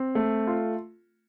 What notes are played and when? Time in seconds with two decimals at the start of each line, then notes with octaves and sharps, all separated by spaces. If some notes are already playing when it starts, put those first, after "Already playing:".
Already playing: C4
0.15 A3
0.47 F4